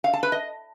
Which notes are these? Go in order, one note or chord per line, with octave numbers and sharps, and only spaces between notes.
F5
A5
B4
D#5